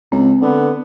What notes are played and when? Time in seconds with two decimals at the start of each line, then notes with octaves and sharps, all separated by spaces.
0.12 C#2 C4
0.42 D3 B3